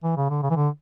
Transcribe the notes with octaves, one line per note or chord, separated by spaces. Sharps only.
E3
C#3
D3
C#3
E3
D3